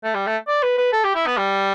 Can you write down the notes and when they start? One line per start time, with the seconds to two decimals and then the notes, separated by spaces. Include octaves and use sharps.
0.04 A3
0.14 G3
0.26 A3
0.47 D5
0.63 B4
0.78 B4
0.92 A4
1.04 G4
1.15 E4
1.26 B3
1.37 G3